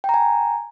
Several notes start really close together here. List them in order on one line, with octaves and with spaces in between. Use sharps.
G5 A#5 G#5